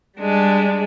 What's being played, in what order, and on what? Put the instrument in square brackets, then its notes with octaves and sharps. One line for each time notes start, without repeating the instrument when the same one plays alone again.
[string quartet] G3 G#3 D4